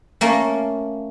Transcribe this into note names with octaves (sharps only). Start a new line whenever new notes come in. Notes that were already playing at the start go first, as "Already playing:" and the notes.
A3 A#3 C#4